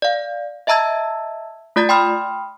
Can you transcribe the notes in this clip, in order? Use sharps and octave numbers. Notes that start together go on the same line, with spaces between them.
D5 F5
D#5 E5 A5 A#5 E6 G#6
A3 F4 D5 A#5 A6
G5 B5 C6 D#6 F6